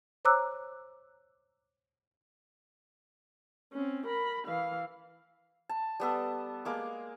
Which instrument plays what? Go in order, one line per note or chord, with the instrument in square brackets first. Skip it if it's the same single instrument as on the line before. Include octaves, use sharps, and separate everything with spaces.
[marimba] C5 C#5 A#5 D6 E6 F#6
[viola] C4 C#4
A#4 B5
E3 F5
[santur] A5
G3 B3 A4
G#3 A#3 D6